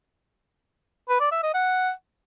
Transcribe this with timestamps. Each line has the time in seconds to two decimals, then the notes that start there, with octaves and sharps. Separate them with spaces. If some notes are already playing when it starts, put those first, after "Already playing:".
1.09 B4
1.20 D5
1.32 E5
1.43 D#5
1.54 F#5